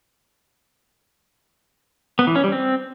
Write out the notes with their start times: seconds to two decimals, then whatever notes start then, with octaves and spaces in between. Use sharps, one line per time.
2.19 B3
2.27 E3
2.36 C#4
2.44 G3
2.52 C4